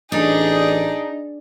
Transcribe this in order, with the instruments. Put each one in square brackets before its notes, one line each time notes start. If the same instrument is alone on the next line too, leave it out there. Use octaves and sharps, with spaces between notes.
[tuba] A1 [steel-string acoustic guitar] D4 [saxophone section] D#4 [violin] G#4 D5